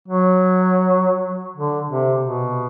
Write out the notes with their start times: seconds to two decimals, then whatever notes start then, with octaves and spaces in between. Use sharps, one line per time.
0.08 F#3
1.56 D3
1.89 C3
2.22 B2